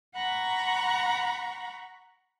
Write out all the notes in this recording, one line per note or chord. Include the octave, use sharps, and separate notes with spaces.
F#5 A#5 B5 C#6